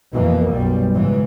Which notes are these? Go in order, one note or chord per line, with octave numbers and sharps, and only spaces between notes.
F2 B2 E3 A#3
B1 F#2 G3
G#2 C#3 E3